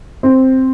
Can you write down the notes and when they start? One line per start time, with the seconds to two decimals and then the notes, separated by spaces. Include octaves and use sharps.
0.23 C4